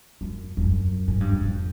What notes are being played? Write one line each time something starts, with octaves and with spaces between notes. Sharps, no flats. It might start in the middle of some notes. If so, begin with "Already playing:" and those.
F#2
F2
F#2
G#2
G2
F#2
F2